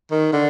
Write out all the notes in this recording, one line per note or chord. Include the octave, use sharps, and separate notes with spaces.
D#3
D3